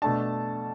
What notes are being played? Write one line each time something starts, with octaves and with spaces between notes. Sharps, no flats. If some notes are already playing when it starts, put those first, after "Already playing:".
B2 A3 D4 A5